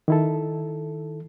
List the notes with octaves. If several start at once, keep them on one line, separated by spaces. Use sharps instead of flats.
D#3 E4 A4